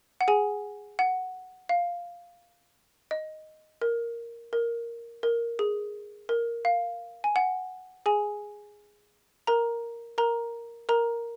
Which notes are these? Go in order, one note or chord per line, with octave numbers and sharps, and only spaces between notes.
F#5
G#4 G#5
F#5
F5
D#5
A#4
A#4
A#4
G#4
A#4
F5
G#5
F#5
G#4 G#5
A#4 A#5
A#4 A#5
A#4 A#5